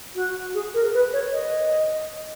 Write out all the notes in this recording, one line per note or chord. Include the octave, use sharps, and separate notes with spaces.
F#4
G#4
A#4
B4
C#5
D#5